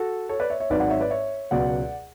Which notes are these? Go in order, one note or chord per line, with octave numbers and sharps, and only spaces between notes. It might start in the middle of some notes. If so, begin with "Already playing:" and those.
Already playing: F#4 A4
A4 C#5
B4 D5
C#5 E5
C#5 E5
G#1 G#2 F#3 B4 D5
D5 F#5
C#5 E5
B4 D5
C#5 E5
C#2 B2 F#3 D5 F#5